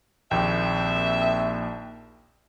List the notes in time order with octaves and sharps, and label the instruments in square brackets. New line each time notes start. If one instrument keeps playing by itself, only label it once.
[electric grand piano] A#1 D#2 G5 [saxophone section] C4 E5